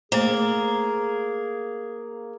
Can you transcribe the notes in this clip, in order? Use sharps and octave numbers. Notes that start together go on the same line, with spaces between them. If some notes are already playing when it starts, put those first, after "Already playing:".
A3 A#3 G#4 C5